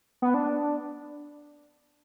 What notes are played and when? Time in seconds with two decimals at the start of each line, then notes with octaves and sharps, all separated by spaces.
0.22 B3
0.34 D4